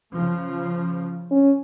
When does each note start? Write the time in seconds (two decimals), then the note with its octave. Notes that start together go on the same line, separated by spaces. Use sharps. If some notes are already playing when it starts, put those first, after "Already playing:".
0.13 C#3 F3
1.31 C#4